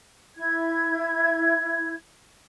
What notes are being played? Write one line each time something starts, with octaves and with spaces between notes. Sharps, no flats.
E4 G#6